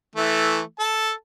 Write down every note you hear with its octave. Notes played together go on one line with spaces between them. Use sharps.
E3 A3
A4 A5